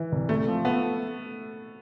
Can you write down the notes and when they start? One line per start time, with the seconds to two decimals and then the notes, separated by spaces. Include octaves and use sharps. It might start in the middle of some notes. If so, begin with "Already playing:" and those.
Already playing: E3
0.12 C2
0.29 C3 A3
0.47 F3
0.65 A3 B3